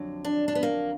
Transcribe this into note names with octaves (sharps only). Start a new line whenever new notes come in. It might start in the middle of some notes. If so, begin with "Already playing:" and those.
Already playing: F2 D3 F#3
D4
D4
B3
A#3